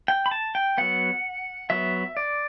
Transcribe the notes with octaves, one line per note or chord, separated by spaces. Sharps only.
G5
B5
A5
G5
F#3 B3 F#5
F#3 B3 E5
D5